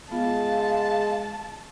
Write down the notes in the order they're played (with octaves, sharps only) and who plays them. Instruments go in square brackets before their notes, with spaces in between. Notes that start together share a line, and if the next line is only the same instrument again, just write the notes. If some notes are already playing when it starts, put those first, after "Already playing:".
[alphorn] G#3 [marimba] B3 F4 [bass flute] F5 [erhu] A5